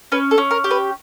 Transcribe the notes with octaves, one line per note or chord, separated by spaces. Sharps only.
C#4 B4
A4
C#4
A#4
G4
B4